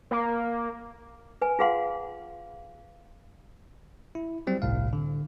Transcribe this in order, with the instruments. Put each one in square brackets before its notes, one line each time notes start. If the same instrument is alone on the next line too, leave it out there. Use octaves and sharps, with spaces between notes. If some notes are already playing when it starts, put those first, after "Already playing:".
[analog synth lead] A#3
[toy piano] B4 G#5
F4 G#4 B4 F5 F#5 C6
[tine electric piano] E4
F#3 G3 C4
G1 C2 A2 F5
D3